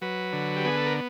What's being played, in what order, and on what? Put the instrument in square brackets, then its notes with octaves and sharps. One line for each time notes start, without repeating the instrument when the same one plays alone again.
[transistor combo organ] F#3 B4
D3
G4
B3 G#4
A4
A#4